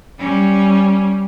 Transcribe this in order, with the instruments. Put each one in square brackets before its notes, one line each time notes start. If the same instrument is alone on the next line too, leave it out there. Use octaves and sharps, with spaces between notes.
[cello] G3 C#4